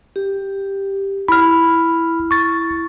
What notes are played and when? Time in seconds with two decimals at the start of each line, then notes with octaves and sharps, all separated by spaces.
0.16 G4
1.28 E4 B5 F6
2.31 C#6 A6